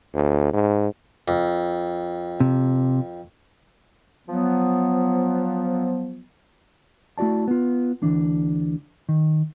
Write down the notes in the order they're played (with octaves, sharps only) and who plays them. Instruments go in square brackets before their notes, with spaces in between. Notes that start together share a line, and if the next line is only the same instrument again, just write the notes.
[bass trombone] D2
G#2
[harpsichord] F2
[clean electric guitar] C3
[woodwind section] F3 F#3 B3
[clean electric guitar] A3 E4 F#4 D5 A5
B3 F4
D2 E3 D4
D#3